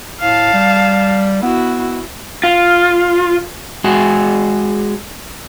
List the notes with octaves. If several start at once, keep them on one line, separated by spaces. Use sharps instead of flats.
A2 F5 A5
G3
B3 E4 F#4
F4
G#3 F#4 G#4